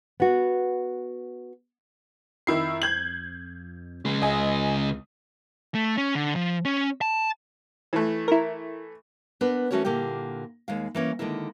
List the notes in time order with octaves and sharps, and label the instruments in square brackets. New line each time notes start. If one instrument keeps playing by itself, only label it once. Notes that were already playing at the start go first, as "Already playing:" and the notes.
[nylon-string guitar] B3 F#4
[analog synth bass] F2 [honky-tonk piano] D#3 E4 C7
[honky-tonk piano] G6 G#6 F#7
[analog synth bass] A#1 [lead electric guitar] C#3 G#3
[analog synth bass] C#2 [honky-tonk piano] D#5 G#5
[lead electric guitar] A3
C#4
D3
F3
C#4
A5
[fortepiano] E3 A3
[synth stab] E4 A#4
[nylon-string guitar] B3 D4 A#4 B4
E3 A3 C#4 F#4 A#4 C#5
A#2 D3 A#3 E4 G4
D#2 G#3 F5
E3 A#3 C#4
D3 D#3 G#3 A#3 E4